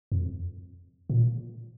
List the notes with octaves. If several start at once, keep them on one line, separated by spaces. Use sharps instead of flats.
F2
A#2